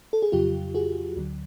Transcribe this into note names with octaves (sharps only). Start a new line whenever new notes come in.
A4
G#4
F2 C#3 F#3 F4 G4
F#4 G#4
D2 D3 F#3